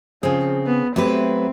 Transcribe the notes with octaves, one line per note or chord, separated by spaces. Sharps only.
C#3 F3 C4 G#4 G#5
B3
F#3 A3 C4 E4 G4 B4